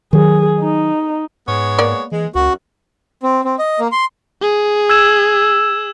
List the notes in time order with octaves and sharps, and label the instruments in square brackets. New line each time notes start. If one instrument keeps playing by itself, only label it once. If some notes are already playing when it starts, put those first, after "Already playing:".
[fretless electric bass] D#3 F#3 [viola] G#4
[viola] D#4
[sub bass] G#2 [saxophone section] G#3 B3 C#5
[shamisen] A#3 D5
[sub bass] E3 [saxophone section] G#3
[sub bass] C#2 [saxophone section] F#2 [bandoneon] F#4
[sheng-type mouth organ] C4
C4
D#5
A#3
C6
[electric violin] G#4
[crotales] E6 G#6 E7